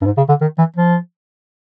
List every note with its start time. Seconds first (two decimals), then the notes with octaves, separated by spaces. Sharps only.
0.01 G2
0.06 G#2
0.17 C#3
0.29 D3
0.41 D#3
0.58 E3
0.76 F3